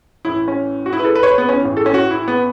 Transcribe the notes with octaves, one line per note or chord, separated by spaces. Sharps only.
A1 A2 E3 E4
C#4
F#4
E4
B4
A4
B4
C#5
B4
B3
C#4
A1 A2 E3
A4
C#4
F#4
E4
B3